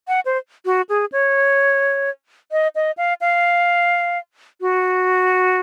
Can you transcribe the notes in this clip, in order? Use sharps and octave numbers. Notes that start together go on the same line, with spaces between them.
F#5
C5
F#4
G#4
C#5
D#5
D#5
F5
F5
F#4